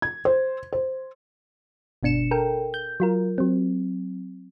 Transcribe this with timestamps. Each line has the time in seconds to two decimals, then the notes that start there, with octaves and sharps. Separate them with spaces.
0.02 G#6
0.25 C5
0.73 C5
2.03 G1 B2 D4 C#7 E7
2.31 A4 A#4 G5
2.74 G6
3.00 F#3 F4 A#4
3.38 F#3 C4